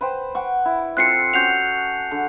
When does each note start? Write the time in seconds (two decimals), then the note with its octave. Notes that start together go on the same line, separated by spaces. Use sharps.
0.01 B4 C5 G5
0.35 F#5 G5 C#6
0.65 E4
0.97 C4 F4 A4 F#6 C7 C#7
1.34 C#4 F#4 G6 C7 F7
2.11 D3